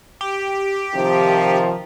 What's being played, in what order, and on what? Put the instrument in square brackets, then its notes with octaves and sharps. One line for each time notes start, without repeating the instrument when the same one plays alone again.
[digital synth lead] G4
[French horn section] C3 D#3 F3